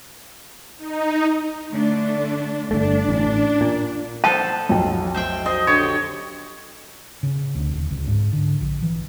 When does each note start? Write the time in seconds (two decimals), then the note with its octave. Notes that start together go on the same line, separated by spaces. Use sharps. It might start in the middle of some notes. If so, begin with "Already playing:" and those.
0.79 D#4
1.71 D3 A3 D4
2.71 G1 D#2 A3 D4
3.09 A1
3.61 A#2
4.24 B3 A4 C5 A5
4.69 B1 F2 F#3
5.14 C5 E5 G5
5.46 C5 D#5
5.67 D3 G4 C#5
7.23 C#3
7.55 D2
7.73 D#1
7.91 C#2
8.07 G#2
8.33 D3
8.61 A#1
8.82 E3